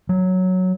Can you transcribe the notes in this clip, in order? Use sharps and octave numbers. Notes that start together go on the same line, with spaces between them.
F#3